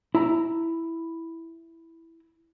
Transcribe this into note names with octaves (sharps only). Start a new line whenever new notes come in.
E4 A#5